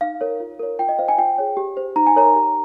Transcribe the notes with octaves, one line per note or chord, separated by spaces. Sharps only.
D#4 F5
A#4 C#5
F4
A#4 C#5
F4 G5
D#5
C5 F5
G#5
F4 G5
G#4 C#5
G4
C5
D#4 A#5
G#5
A#4 C#5 A#5
G4